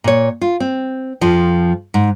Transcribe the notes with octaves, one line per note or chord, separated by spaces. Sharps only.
A#2 C#5
F4
C4
F2 F3
G#2